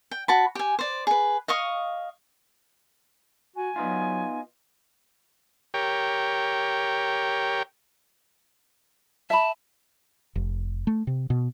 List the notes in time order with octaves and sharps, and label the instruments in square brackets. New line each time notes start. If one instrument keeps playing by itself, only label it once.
[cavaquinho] G5
F#4 A5 B5
G4 G#5
C5 D5
G#4 B4
D#5 F5 C#6 D#6
[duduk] F#4 [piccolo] G#5
[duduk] F#3 [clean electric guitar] B3 D#4 F4
[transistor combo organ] G4 A#4 C#5 G5
[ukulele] E5 B5 [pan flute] A5
[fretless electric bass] F1
A3
C3
B2